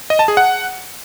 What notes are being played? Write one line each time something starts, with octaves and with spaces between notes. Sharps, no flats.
D#5
A5
G#4
F#5